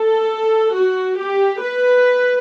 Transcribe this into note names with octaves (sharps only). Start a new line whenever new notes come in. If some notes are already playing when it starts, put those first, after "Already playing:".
Already playing: A4
F#4
G4
B4